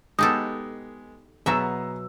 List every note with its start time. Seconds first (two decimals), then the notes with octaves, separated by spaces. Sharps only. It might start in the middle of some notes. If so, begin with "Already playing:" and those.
0.19 G#3 B3 D#4 G4 A4 D#6
1.46 B2 F#3 B3 G#4 E5 A#5 E6